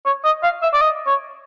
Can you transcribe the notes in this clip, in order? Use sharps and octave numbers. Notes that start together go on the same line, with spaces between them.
C#5
D#5
F5
E5
D5
D#5
C#5